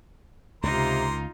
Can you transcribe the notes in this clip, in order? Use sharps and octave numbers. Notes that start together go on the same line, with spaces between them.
C#2 C3 A#3 D#4 F4 A#5 C6